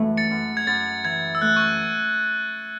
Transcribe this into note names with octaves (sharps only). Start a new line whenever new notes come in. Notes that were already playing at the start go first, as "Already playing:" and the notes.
Already playing: F#2 E3 A3
A6 C#7
F#2
G#6
F#2 A6
E3 G#6
E6
A3 F#6
C#6